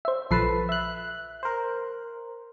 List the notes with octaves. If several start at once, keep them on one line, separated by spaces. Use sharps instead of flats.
C5 E5
A#1 F3 A4 B4 A5 C7
E5 F#6
A#4 C5